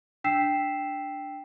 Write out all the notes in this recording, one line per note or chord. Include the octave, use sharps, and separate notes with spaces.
D4 G5 E6 B6 C7 E7